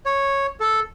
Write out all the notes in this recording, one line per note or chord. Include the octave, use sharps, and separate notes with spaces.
C#5
A4